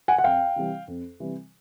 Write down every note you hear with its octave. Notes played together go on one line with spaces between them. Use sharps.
F#5 G#5
F#5
F2 F5 G5
C3 E3 G3
F2
C3 E3 G3